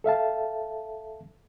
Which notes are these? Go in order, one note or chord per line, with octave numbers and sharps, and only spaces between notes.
A4 E5 F5 A5